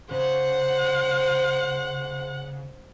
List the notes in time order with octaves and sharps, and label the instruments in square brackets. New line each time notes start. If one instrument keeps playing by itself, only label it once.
[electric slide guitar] C#3 [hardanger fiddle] C5 [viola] F#5